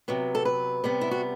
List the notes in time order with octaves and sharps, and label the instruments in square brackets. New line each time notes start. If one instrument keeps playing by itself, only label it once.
[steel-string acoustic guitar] C3 F#3 B3
A4
B4
C3 G3 B3
E4
F#4